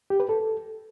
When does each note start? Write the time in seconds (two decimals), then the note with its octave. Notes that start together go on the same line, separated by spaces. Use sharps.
0.10 G4
0.20 B4
0.29 A4